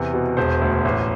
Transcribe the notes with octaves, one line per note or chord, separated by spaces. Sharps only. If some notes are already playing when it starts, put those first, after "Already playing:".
Already playing: E2 C3
B2
E1 C5
D2
A1